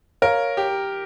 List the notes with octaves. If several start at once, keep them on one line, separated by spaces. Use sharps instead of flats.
A#4 C#5 F5
G4